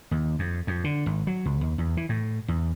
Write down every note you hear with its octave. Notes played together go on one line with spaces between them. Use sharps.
D#2
F2
F2
D3
G#1
F#3
C#2
D#2
E2
E3
A2
E2